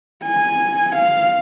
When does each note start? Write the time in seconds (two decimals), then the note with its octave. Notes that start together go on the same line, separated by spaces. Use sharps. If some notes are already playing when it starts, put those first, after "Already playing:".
0.25 G#5
0.96 F5